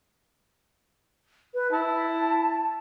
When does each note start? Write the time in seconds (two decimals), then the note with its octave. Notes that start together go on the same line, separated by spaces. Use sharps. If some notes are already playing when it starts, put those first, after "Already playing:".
1.54 B4
1.72 E4 A5